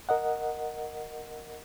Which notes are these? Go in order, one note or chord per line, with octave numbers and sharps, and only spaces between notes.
A#4 D#5 F#5